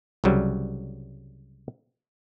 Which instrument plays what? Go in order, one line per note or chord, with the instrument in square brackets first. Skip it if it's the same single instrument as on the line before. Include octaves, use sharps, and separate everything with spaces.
[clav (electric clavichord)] C2 C#3 F#3 G3